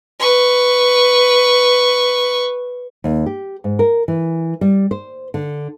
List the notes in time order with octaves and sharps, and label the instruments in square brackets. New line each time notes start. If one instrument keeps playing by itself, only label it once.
[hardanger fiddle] B4 C#6
[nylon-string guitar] D#2
G4
G#2
A#4
E3
G3
C5
D3